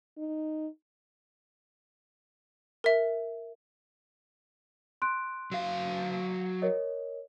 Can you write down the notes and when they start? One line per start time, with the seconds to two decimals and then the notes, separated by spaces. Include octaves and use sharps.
0.18 D#4
2.84 A#4 E5
5.02 C6 F#6 D7
5.52 F#3 F5
6.62 A#4 C#5 D#5